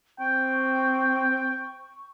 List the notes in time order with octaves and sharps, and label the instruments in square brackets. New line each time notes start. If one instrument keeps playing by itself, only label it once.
[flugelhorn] C4 [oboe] G5 [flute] C#6